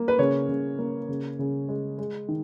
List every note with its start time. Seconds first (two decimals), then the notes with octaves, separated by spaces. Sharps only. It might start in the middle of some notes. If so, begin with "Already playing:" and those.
Already playing: A#3
0.08 B4
0.19 C#3 C#5
0.49 C#3
0.79 A#3
1.09 C#3
1.39 C#3
1.68 G#3
1.98 G#3
2.28 D#3